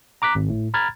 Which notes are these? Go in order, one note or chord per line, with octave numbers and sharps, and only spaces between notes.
A#5 D6 F#6 B6
G#1
A2
A#5 B5 F6 G#6 A6